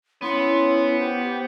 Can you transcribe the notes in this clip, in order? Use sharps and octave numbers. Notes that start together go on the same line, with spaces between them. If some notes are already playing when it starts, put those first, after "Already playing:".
B3 C#4 E4 C6
G4 C5